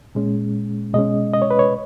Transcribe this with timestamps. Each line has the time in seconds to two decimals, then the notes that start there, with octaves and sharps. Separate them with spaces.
0.15 A#2 G#3 C#4
0.94 B2 G#3 C#4 D#5
1.34 D#5
1.42 C#5
1.51 B4
1.59 C#5